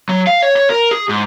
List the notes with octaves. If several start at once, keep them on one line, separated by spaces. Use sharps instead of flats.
F#3
F5
C#5
C#5
A#4
G#4
G#2